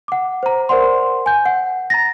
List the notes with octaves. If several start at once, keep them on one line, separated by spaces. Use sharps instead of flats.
F#5 D6
C5 A#5
A#4 C5 D5 F#5 C6
G#5 G6
F#5
A#5 A6 A#6